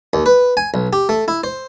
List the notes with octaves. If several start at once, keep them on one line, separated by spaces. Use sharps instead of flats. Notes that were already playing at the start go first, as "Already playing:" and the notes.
D#2
B4
G#5
B1
G4
A3
E4
C5